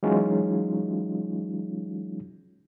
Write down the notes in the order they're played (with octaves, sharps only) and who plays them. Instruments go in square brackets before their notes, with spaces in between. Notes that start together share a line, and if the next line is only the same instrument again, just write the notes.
[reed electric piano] E3 F#3 G#3 C#4 D#4 F4